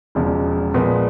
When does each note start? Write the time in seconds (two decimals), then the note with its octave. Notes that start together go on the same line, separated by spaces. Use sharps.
0.15 E1 E2 C#3 F3 G#3
0.74 A#1 A#2 F3 G#3 B3